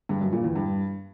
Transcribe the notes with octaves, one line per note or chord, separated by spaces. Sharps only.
G2
F#2
A#2
E2
G2